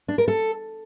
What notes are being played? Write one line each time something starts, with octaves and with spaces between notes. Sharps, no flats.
D4
A#4
A4